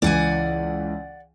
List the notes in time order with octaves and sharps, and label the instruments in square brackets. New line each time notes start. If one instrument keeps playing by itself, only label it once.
[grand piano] C#2 E3 [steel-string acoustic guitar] D5 F#5 G#5